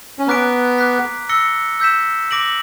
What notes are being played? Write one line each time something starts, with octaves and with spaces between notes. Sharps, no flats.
C#4
B3 A#5 D6 F#6 B6 D7
D6 F#6 B6
E6 A#6 C#7 G7
E6 G6 B6 E7
D6 A#6 D7 F#7